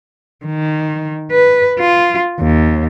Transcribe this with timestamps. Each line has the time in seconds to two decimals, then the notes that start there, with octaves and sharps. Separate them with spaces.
0.46 D#3
1.31 B4
1.79 F4
2.40 D#2